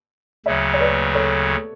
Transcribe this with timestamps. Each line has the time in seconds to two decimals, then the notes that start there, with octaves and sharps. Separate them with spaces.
0.46 D2 C#3 F#3 C#5 E5
0.74 C#5
0.80 B4 D5
1.14 A4 C#5